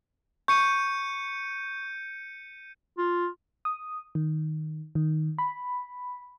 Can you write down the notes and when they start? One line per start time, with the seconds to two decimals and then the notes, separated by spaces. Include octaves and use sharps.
0.48 C#6 G6 C#7 D#7
2.98 F4
3.65 D#6
4.15 D#3
4.95 D#3
5.38 B5